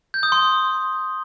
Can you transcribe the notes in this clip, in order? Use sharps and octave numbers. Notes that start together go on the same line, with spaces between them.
G6
D#6
C6